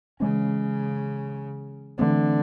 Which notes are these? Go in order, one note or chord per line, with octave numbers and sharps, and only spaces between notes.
C#3 E3 G#3 C#4
D3 E3 A3 C4